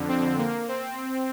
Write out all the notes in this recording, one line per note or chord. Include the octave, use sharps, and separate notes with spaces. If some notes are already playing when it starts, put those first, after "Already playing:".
Already playing: F2 D3
C4
A#3
C4